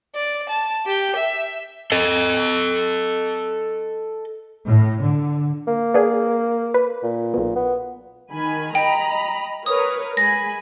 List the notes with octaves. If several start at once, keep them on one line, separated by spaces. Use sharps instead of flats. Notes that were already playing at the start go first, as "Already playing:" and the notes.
D5
A5
G4 G6
E5
A4 D#5
A2
D3
A#3
B3 D4 G#4
B4
A#2
B1 B2
B3
D#3 G#5 B5
D#5 G5 A#5 B5
A#4 B4 C#5 D#6
G#3 G#5 B5 A#6